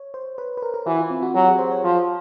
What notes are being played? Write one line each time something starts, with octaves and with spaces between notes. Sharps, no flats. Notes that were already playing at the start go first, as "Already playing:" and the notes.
Already playing: C#5
C5
B4
B4
A#4
A#4
E3 F#4
F4
C4
F#4
F#3 G4
G#4
C5
C#5
F3